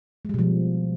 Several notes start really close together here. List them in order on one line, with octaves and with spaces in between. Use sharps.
G#3 G3 B2 F3